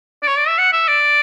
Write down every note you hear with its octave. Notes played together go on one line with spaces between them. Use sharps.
D5
C#5
D5
E5
F#5
E5
D5